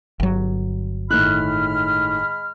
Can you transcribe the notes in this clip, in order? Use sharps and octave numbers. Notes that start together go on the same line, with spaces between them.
G1 F#3
A2 D#3 G#3 B5 F6 F#6